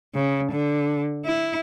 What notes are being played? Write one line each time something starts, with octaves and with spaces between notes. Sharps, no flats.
C#3
D3
E4